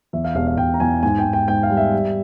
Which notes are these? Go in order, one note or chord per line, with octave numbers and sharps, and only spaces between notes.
E2 E5
F5
E1 F5
F5
E1 G5
A#5
E2 G#5
G#2 G#5
G5
G#2
G5
G#2 G5
F5
G3
E5
G3